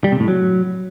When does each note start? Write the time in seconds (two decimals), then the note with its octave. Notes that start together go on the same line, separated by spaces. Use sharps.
0.04 G3
0.12 C3
0.20 A2
0.28 F#3